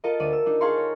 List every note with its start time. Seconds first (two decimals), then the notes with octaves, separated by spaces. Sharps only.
0.04 F4 A4 A#4 D#5
0.20 D2 D5 D#7
0.33 E6
0.46 D4 D#4
0.61 G#4 A4 F5 A#5 C6 C#6
0.78 C#5